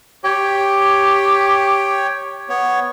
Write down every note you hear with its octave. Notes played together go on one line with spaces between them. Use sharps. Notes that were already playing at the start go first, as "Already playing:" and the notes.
G4 C#5 G5
B3 C#5